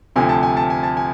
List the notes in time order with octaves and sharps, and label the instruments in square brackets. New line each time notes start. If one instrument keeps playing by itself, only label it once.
[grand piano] D2 C3 F3 G#5
A5
G#5
A5
G#5
A5
G#5